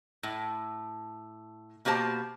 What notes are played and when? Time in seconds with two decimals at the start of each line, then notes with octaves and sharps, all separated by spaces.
0.23 A2
1.85 B2 A#3 G4 C5 A5